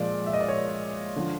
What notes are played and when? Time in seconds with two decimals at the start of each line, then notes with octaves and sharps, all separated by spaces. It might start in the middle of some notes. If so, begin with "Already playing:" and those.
Already playing: A#2 F3 G#3 D5
0.26 E5
0.33 D#5
0.41 D5
0.48 C#5
1.16 D3 F3